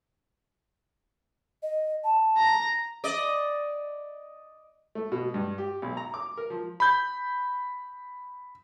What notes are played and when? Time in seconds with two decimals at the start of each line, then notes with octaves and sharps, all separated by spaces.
1.63 D#5
2.04 A5
2.37 A#5
3.04 D5 D#5
4.95 A3
5.12 B2
5.34 G2
5.58 G4
5.82 B1
5.97 A#5
6.14 D6
6.37 A#4
6.50 F3
6.80 B5 G6